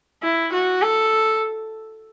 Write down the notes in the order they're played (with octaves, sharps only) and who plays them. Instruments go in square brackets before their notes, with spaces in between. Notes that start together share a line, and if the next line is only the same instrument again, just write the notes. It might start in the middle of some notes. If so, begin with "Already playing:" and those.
[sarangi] E4
F#4
A4